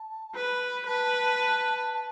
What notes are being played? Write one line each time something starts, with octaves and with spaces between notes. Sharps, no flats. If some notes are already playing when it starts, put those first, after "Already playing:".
Already playing: A5
B4 B5
B4 A5
A5